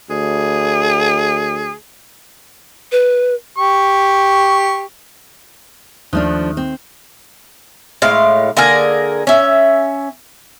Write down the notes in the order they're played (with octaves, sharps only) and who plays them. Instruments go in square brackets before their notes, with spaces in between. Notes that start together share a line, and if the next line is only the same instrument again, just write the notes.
[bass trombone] D2 [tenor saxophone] G#4
[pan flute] B4
[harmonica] G4 C#6
[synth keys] D#2 [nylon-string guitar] F3 A3 D4
[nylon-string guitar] C4
[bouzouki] A2 G#3 F5
D3 A#3 G#4 A#4
C#4 E5